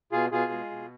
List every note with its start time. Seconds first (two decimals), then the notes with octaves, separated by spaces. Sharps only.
0.12 B2 F4 G#4
0.32 B2 F4 G#4
0.52 G#3
0.71 B2